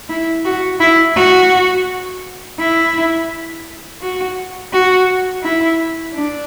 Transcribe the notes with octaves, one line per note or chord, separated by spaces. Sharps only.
E4
F#4
E4
F#4
E4
F#4
F#4
E4
D4